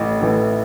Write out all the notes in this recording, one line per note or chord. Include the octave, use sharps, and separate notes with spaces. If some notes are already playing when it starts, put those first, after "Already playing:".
Already playing: A1 A2 E3
A2 E3